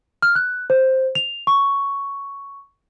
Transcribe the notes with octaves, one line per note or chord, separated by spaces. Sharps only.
F6
F#6
C5
F7
C#6